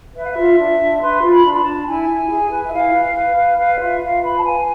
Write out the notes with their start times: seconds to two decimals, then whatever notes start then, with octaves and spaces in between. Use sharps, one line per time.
0.15 B4 E5
0.22 F5
0.30 E5
0.36 F4
0.58 D4
0.79 D4
1.00 B4 C6
1.22 F4
1.29 B5
1.44 D4
1.53 B5
1.57 A5
1.65 D4
1.86 E4 G#5
2.08 E4
2.29 G#4
2.50 B4
2.66 E5
2.71 E4 F5
2.93 B4
3.14 B4
3.37 B4
3.57 B4 F5
3.79 F4 E5
4.00 F4 F5
4.22 B4 B5
4.38 A5
4.43 B4 G#5